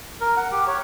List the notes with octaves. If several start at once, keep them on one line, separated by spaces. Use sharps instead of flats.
A#4
F#5
G4
C#5